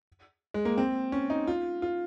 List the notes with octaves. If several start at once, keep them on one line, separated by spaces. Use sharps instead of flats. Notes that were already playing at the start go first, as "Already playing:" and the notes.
G#3
A#3
C4
C#4
D#4
F4
F4